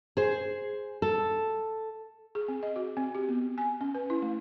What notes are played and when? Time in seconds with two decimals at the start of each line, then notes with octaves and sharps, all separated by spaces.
0.17 G#4 C5
1.02 A4
2.35 G#4
2.48 C4
2.63 D#5
2.76 F#4
2.97 C4
3.15 G4
3.29 B3
3.58 G#5
3.81 C#4
3.95 B4
4.10 E4
4.22 A3